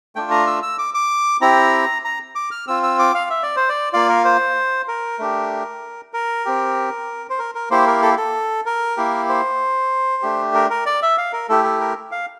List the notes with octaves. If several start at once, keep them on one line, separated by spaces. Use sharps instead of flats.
A3 D4 F4 G5
A#5
E6
E6
D6
D6
C4 E4 G4 A#5
A#5
D6
F6
C4 F4 E6
E6
D6
F5
E5
D5
C5
D5
A#3 F4 D5
A#4
C5
A#4
A3 D4 G4
A#4
C4 G4
C5
A#4
A#4
A#3 E4 G4 C5
A#4
A4
A4
A#4
A#3 E4 G4
C5
A3 D4 G4
A#4
A#4
D5
E5
F5
A#4
A3 E4 G4 A4
A4
A#4
F5